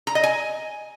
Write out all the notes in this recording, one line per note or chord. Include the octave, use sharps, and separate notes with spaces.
A#5
D#5
G#5